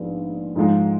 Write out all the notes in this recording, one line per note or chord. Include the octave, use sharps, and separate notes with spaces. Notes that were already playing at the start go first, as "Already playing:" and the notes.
Already playing: A#1 G#2 F3 B3
G#2 F3 G#3 D#4